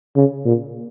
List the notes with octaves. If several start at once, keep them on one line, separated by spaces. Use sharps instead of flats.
C#3
A#2